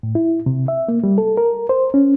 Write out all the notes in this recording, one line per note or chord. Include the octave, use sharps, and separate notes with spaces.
A2
E4
C3
E5
A#3
G3
A4
A#4
C5
C#4